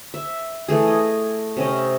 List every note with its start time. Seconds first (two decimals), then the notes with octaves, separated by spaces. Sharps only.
0.14 E5
0.68 E3 A3 G#4
0.88 D#5
1.57 C3 C#4 D#5